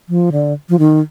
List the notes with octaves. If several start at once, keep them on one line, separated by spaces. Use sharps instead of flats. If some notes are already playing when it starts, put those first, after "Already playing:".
F3
D3
F3
D#3